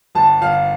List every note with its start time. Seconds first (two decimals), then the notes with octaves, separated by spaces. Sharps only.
0.15 G1 A5
0.41 G1 F5